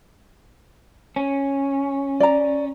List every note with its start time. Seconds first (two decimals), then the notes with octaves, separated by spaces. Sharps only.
1.16 C#4
2.20 D5 A#5